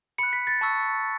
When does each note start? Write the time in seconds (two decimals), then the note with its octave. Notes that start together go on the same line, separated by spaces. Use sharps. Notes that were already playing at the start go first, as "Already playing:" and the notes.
0.18 B5 F#6 C#7
0.33 B6
0.47 A6
0.61 A5 C#6 E6